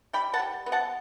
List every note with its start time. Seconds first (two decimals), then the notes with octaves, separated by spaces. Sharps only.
0.13 G3 G5 B5
0.33 F#5 A5
0.39 G3
0.66 B3
0.72 F#5 A5